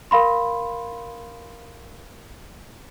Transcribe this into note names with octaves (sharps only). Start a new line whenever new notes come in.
A#4 F5 B5 C6